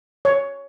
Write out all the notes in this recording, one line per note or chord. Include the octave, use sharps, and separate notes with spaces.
C#5